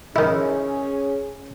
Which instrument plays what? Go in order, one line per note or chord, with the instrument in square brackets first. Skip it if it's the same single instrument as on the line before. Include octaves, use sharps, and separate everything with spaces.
[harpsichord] D#3 E4 [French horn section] C#4 G#4